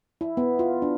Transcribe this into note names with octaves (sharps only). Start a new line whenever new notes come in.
E4
B3
F4
D4